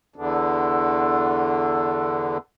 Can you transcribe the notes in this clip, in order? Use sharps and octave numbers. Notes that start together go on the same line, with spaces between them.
E2 D3